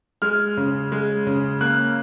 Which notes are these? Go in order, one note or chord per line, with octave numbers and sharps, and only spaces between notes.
G#3 F6
C#3
G#3
C#3
A#3 F#6